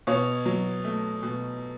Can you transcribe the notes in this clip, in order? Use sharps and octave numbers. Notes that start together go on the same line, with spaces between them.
B2 C#5
F#3
A3
B2